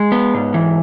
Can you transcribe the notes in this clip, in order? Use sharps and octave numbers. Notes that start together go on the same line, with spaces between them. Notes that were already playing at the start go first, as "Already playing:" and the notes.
Already playing: G#3
B3
G#2
E3